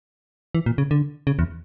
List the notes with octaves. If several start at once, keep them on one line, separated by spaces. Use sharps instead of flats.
E3
A#2
C#3
D3
C#3
E2